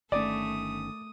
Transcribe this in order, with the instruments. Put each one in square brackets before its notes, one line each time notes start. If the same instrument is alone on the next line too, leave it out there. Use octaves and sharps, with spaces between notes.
[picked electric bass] G1 D#3 C#4 [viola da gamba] A3 [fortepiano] D5 [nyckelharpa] D#6